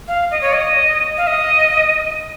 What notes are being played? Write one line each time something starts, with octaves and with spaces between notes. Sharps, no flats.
F5
D#5
C#5
D#5
F5
D#5